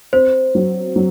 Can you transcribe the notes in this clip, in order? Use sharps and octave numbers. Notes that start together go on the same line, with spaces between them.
C4 C5
F#3
F#3